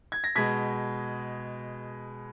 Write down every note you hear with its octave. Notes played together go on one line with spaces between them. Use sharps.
G#6
A#6
B2 G#3 G#6 B6